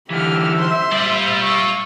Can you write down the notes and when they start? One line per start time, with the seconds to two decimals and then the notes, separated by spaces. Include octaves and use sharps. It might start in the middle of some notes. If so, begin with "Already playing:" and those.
0.10 D3 E3 G4 E5 F6
0.58 C5 C6
0.92 G3 F4 D5
1.42 C#6 E6